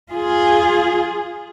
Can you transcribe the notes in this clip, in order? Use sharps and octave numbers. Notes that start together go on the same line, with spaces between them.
F4 G#4